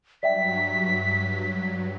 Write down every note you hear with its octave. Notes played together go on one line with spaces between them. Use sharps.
G2 F#3 D5 E5 G5 B6